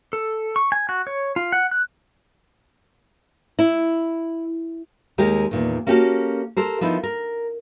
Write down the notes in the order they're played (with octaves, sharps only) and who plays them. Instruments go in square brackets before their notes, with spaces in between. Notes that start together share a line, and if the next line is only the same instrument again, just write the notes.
[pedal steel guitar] A4
C#6
G#5
F#4
C#5
F4
F#5
F#6
[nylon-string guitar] E4
D#2 G#3 G4 A#4
E2 A#2 D#3
A#3 C#4 F#4 G4 A4
G4 A4 A#4 C5
F3 B3 D#4 E4
A#4